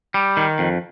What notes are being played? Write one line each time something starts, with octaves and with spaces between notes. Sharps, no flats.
G3
D#3
F2